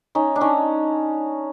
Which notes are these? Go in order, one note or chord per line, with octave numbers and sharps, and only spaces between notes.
C#4 D#4
D4
C#4 D#4